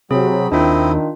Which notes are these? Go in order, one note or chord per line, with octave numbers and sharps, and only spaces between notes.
C3 F#3 C4 G#4 B5
D#2 D#3 C4 D4 E4 F4 D#5